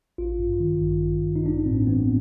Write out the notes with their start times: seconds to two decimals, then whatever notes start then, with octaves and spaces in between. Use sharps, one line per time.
0.18 A1 F4
0.39 G2
0.60 D#3
0.82 A1
1.03 A1
1.24 G2
1.36 D#4
1.45 A1 D4
1.66 A2 C4
1.87 E3 B3